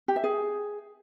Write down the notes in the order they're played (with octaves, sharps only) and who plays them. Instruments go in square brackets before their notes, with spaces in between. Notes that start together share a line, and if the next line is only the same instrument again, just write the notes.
[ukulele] G4
E5
G#4